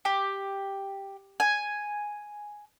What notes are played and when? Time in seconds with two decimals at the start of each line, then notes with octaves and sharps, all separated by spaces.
0.05 G4
1.40 G#5